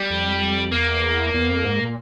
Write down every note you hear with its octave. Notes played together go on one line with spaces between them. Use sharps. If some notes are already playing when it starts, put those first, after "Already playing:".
Already playing: G3
F2
E2 A#3
E2
F2
G#2
A#2